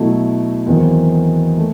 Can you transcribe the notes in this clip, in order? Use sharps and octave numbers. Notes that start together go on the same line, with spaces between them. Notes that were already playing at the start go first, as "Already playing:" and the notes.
Already playing: B2 F#3 A3 E4
E2 D#3 F#3 C4
A3